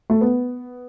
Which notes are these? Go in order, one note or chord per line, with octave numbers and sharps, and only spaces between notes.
A3
B3